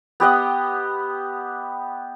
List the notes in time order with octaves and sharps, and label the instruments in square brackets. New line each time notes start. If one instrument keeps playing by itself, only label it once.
[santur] B3 G4 D#5 F#5